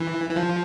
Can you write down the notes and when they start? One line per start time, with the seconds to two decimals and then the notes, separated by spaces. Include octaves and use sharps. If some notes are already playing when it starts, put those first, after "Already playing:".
Already playing: E3
0.30 E3
0.36 F3